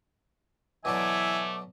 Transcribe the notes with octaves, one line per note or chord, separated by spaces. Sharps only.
B2 E3 F#3 A3 D5 E5 G#5 D6